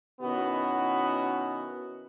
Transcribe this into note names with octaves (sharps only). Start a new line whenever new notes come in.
B2 D#3 B3 C#4 E4 F#4